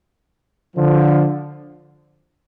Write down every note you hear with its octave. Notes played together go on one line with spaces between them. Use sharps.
D3 F3